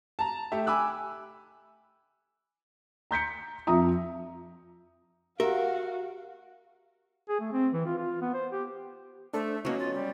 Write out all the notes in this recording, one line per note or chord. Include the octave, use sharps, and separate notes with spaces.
A5 A#5
A3 G4 E5
G#5 B5 D6 E6 F#6
A#5 G6 B6 C#7
F2 F3 E5 A#5 D#6
F#4 G4 A#4 E5 F5
G#4
A3
C4
E3
F4
F4
B3
C5
G4
A3 D4 A4 C5
F#3 A#3 B3 C#4 F#4 D#5
F4
G3